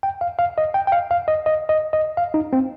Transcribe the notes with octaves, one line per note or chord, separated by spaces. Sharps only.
G5
F5
F5
D#5
G5
G5
F5
F5
D#5
D#5
D#5
D#5
F5
D#4
C4